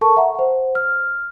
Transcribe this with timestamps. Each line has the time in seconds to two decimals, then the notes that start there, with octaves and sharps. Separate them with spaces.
0.01 A4 A#4 A5 C#6
0.17 E5 F#5 A#5
0.35 C5 F#5
0.75 F6